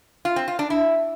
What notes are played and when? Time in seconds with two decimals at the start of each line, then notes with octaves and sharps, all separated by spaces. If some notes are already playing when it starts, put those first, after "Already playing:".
0.25 F4
0.36 C4
0.48 F4
0.59 D4
0.70 E4